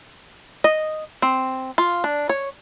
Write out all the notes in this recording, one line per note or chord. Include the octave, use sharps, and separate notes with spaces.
D#5
C4
F4
D4
C#5